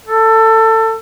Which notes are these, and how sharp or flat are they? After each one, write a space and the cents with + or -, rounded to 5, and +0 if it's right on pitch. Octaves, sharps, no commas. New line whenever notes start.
A4 +20